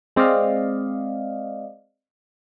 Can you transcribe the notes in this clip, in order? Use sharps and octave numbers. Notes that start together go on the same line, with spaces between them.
G#3 C4 D5 D#5 F5